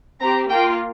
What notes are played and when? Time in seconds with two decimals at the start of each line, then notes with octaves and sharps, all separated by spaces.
0.21 C4 G4 A#5
0.50 A#3 F4 G5